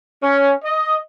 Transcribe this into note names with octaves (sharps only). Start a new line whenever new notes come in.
C#4
D#5